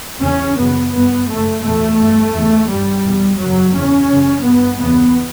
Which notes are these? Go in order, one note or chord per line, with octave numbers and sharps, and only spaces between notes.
E2 C#3 C#4
F#2 C#3 B3
G2 B3
F#2 C#3 A3
E2 B2 A3
G2
E2 C#3
G2 G3
E2 B2
F#2 C#3 F#3
E2 C#3 C#4
F#2 C#3
G2 B3
E2 C#3 B3